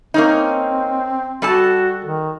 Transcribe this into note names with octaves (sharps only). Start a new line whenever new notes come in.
A#3 C4 C#4 D#4
G3 F#4 A4 A5
D#3